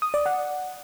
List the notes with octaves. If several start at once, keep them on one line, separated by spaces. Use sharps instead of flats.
D#6
D5
F#5